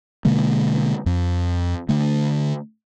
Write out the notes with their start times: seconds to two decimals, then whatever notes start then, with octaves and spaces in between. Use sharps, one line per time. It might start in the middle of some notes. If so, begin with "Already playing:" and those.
0.25 B2 D3 G#3 A#3
1.06 F2
1.89 D3 A3